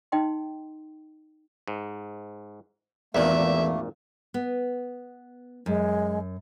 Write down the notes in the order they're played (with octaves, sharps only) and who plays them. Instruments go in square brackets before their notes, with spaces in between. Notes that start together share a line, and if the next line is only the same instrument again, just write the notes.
[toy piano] D#4 D#5 G5 C6
[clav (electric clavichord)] G#2
[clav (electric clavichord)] G#1 A#2 [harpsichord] E2 D4 [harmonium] A3 A#3 [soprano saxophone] E5
[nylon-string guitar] B3
[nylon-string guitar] F#2 [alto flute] G#3